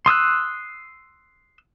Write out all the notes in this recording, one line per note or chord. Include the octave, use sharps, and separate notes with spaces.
C6 D#6 E6 F#6